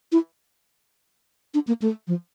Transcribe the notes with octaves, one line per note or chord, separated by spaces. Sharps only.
E4
D4
A#3
A3
F3